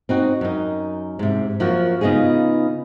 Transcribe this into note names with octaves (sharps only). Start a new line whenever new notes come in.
C4 D#4 F#4
F#2 D#4
G#2 C3
F#2 F3 A#3 F#4
C#3 B3 D#4 F4 G#4